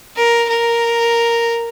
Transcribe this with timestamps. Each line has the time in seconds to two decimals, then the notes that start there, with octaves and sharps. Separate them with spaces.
0.16 A#4
0.49 A#4